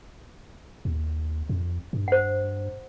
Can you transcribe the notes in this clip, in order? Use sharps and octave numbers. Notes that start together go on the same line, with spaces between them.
D#2
F2
G2
C5 F#5